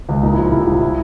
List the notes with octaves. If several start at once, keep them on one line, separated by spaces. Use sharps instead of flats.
C#2
A#2 D#4
E4
F3 F4
C2 E4
C2 F4
E4